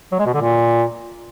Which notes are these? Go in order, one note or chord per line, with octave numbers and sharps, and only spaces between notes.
F#3
G#3
B2
D3
A#2